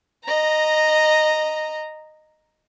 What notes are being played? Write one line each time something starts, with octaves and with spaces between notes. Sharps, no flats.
D#5 A#5